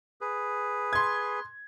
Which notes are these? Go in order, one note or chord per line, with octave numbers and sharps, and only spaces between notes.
G#4 B4
C6 G#6